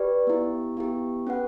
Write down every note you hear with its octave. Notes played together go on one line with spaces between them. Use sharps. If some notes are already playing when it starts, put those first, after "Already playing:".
Already playing: G4 B4 D5
B3 E4 G4
B3 E4 G4
C#4 G4 B4 F#5